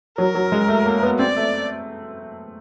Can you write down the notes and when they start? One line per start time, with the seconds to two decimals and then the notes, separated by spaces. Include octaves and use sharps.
0.18 F#3 A#4
0.35 F#3
0.52 G#3
0.68 A3
0.86 A#3
1.03 B3
1.19 C4 D5
1.36 A3